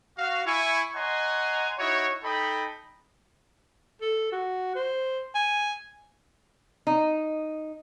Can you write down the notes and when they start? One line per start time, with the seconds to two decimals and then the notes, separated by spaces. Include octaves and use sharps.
0.17 F#4 F5
0.46 E4 G#5 C#6
0.95 C#5 D#5 F#5 G#5 A#5 C6
1.78 D#4 E4 F#4 C#5
2.23 D#4 A4 D#5 G5 B5
4.01 A4
4.32 F#4
4.75 C5
5.35 G#5
6.87 D#4